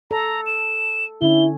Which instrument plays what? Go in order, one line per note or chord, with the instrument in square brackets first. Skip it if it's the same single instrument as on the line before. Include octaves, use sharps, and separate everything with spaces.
[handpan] A4 [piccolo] A#5
[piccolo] E7
[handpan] D3 C#4 [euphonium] E4 [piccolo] G7